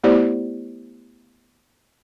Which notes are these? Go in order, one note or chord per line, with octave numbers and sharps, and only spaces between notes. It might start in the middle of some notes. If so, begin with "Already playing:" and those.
A3 B3 E4 G4 C5 D5